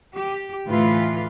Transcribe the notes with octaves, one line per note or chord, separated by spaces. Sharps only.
G4
D2 A2 E3 F4 B4